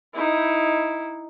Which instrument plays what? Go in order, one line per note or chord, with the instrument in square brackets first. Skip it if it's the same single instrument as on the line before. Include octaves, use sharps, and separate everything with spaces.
[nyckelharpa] D#4 E4